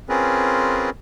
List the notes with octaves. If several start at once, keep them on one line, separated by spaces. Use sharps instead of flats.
C4 C#4 F4 G#4 A#4 B4